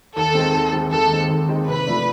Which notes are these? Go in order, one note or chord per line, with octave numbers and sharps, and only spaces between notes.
D#2 A4
D#3 G#3 C4
D#2
D#3 G#3 C4
D#2 A4
D#3 G#3 C4
D#2
D#3 G#3 C4
C3 B4
F3 A3 D4